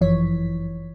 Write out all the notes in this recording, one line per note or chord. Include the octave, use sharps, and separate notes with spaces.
G1 F#2 E3 F3 C#5 B6